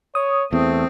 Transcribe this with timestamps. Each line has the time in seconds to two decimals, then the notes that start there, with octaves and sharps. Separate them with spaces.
0.15 C#5 D#6
0.53 E2 A3 C4